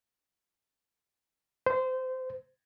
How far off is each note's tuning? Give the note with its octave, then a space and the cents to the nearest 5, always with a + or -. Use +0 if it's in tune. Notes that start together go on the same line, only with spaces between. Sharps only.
C5 -20